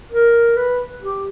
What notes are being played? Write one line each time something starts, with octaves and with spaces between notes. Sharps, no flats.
A#4
B4
G4